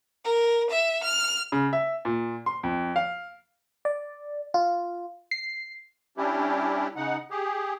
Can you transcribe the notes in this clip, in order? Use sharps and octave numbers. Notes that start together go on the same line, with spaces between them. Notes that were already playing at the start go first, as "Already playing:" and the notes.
A#4
E5
F6
C#3
E5
A#2
C6
F2
F5
D5
F4
C7
G3 C#4 D4 E4 G4
C#3 D#4 F#5
G4 G#4